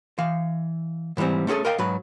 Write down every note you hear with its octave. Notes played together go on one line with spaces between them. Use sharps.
E3 F5
G#2 E3 F3 G3 C4
A3 C#4 E4 G#4 A4
A#4 D5 D#5 F5 G5
G#2 F#3 B4